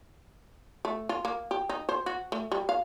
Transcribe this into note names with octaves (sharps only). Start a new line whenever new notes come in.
A3
F4
A#3
G4
D#4
C5
F#4
A3
G3
F5